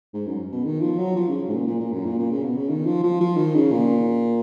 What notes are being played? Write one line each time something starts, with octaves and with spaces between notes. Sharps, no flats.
G#2
F#2
B2
D#3
F3
F#3
F3
C#3
G#2
A#2
A#2
A#2
F#2
A#2
A#2
C#3
B2
C#3
D#3
F3
F3
F3
D#3
C#3
A#2